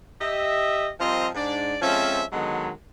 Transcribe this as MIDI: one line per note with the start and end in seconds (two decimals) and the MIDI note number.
0.21 0.90 67
0.21 0.90 75
0.21 0.90 76
1.00 1.29 53
1.00 1.29 55
1.00 1.29 60
1.00 1.29 65
1.00 1.29 70
1.00 1.29 75
1.35 1.76 44
1.35 1.76 62
1.35 1.76 74
1.82 2.24 53
1.82 2.24 56
1.82 2.24 60
1.82 2.24 61
1.82 2.24 69
1.82 2.24 76
2.32 2.70 50
2.32 2.70 51
2.32 2.70 54
2.32 2.70 56
2.32 2.70 59